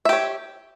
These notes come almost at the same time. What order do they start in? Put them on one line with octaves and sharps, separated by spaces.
E5 G4 C#5